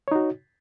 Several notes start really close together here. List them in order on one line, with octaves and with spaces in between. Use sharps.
C#5 D#4 F#4